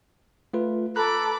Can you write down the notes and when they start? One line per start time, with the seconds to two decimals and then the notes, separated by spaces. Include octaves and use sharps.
0.54 A3 F4 B4
0.96 A4 A#5 B5 D6 F#6